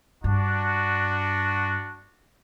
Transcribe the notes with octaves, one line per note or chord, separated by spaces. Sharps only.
G2 D4 F#4